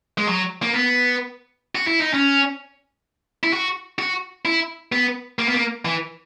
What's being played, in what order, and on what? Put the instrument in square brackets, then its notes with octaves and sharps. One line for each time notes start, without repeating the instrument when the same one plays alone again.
[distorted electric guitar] G#3
F#3
A#3
B3
F#4
E4
D#4
C#4
E4
F#4
F#4
E4
B3
A#3
B3
A#3
E3